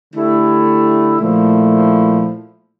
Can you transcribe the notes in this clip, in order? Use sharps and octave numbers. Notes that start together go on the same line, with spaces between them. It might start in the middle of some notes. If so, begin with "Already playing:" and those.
D3 A3 E4 G4
A#2 F3 A3 E4